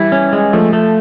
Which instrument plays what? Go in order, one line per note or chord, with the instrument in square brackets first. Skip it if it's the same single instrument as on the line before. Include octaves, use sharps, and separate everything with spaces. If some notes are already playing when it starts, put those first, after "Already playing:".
Already playing: [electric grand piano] E3 G3 [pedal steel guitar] E4
[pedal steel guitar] C#4
G#3
[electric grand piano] F3 [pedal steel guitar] A3
[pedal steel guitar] A3